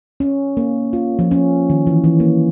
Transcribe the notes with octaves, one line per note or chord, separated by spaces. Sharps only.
C#4
A#3
F4
F3
C#4
D#3
E3
E3
A#3